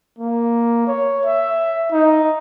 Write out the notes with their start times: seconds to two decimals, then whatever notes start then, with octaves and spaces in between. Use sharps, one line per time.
0.19 A#3
0.87 C#5
1.25 E5
1.92 D#4